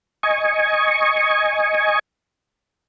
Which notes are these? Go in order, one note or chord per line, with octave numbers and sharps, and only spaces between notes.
D#5 G#5 C#6